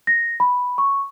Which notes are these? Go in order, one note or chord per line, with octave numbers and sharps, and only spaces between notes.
A#6
B5
C#6